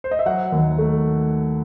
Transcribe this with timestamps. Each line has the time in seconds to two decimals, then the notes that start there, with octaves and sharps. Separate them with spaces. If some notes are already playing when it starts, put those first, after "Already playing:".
0.04 C5
0.11 D#5
0.19 E5
0.26 F#3 F#5
0.52 D#2
0.78 A3